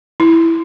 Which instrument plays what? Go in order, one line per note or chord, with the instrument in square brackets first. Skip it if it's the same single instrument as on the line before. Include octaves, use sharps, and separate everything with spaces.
[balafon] E4